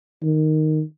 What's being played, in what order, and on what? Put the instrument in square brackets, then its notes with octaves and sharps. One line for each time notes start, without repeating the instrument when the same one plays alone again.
[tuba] D#3